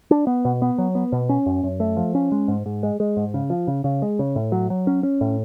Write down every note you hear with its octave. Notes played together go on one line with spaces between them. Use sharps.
D4
B3
B2
B3
F#3
B3
B2
C#4
F#2
F#2
A3
F3
C#4
G#3
G#2
G#2
G#3
G#3
G#2
C#3
F3
C#3
C#3
G#3
C#3
A2
F#3
F#3
C#4
C#4
A2